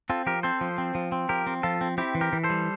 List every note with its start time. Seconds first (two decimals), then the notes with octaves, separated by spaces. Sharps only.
0.10 C4 F4 A4
0.26 F3 G4 A#4
0.43 C4 A4 C5
0.61 F3
0.78 C4
0.95 F3
1.12 C4
1.29 F3 G4 A#4
1.47 C4
1.63 F3 F4 A4
1.81 C4
1.98 C4 E4 G4
2.15 E3
2.21 G4 A#4
2.33 E3
2.44 A4 C5
2.50 G3